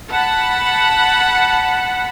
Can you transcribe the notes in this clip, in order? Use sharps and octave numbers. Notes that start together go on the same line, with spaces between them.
F#5 A5 B5